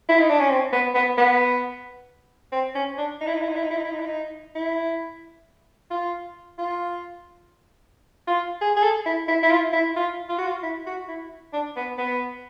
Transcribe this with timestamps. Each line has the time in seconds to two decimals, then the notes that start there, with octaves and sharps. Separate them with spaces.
0.09 E4
0.20 D#4
0.30 D4
0.39 C#4
0.50 C4
0.73 B3
0.95 B3
1.18 B3
2.52 C4
2.75 C#4
2.98 D4
3.21 D#4
3.27 E4
3.35 D#4
3.42 E4
3.49 D#4
3.56 E4
3.63 D#4
3.71 E4
3.77 D#4
3.85 E4
3.92 D#4
4.00 E4
4.06 D#4
4.55 E4
5.91 F4
6.58 F4
8.28 F4
8.61 G#4
8.77 G#4
8.83 A4
9.06 E4
9.28 E4
9.43 E4
9.51 F4
9.73 E4
9.96 F4
10.29 F4
10.39 F#4
10.47 F4
10.63 E4
10.87 F#4
11.08 E4
11.53 D4
11.76 B3
11.98 B3